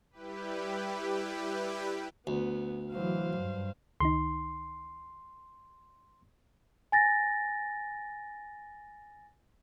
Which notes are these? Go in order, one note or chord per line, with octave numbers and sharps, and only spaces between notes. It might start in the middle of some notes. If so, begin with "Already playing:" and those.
G3 E4 G4 B4
D2 B3
E3 F#3 C5 F5
G2
C#2 D#3 D#4 C6
G#5 A6 A#6